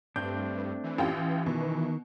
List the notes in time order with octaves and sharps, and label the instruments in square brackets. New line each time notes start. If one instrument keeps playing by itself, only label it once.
[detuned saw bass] G2 [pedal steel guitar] A3 C4 D4 [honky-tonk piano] G6
[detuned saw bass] E3
[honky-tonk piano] A1 F4 G4
[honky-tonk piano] B2 [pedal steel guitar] D#3